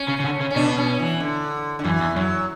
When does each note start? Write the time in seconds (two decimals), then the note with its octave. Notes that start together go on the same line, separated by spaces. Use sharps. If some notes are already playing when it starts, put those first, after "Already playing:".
Already playing: C#4
0.08 C#3
0.20 C#3
0.24 D3
0.41 C#3
0.50 C#4
0.56 B2 D4
0.78 C#4
0.99 E3
1.20 D3
1.79 D3
1.84 F#2 E3
2.00 E2
2.16 F#2 F#3